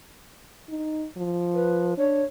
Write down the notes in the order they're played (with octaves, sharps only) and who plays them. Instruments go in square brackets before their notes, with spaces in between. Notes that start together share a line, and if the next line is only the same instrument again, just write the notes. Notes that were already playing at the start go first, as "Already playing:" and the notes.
[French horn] D#4
F3
[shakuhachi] B4
[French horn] D4 [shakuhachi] C#5